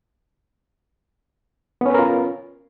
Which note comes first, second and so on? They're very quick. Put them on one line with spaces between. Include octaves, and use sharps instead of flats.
B3 C#4 B4 A#4 F4